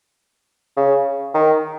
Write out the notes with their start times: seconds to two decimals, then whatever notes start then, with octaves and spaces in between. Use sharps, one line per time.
0.77 C#3
1.34 D#3